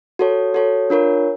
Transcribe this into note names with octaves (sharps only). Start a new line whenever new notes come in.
F#4 A4 C#5
F#4 A4 C#5
D4 F4 A#4 C#5